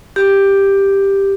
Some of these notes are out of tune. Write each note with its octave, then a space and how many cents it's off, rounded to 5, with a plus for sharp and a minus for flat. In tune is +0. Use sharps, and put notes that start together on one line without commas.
G4 +5